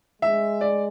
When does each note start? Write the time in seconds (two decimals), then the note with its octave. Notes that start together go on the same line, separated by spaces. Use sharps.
0.22 G#3 E5
0.61 D5